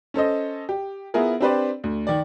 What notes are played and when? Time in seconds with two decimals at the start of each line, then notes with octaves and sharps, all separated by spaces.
0.14 C#4 A4 C5 D#5
0.69 G4
1.14 B3 E4 F4 G#4 A#4
1.40 C4 D4 G4 B4 C5 D5
1.84 D2
2.07 D#3 D5